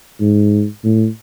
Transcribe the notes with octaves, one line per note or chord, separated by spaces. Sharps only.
G#2
A2